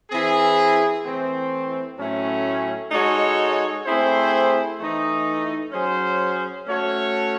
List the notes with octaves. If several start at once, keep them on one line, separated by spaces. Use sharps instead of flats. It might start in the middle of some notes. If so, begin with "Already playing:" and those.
E3 C4 E4 G#4
E3 A3 C4
A2 F#3 A3 C#4
G#3 D#4 F#4 A4 C#5
A3 C4 E4 G#4 C5
E3 A3 D#4
F#3 C#4 G#4 C5
A3 C#4 F#4 C#5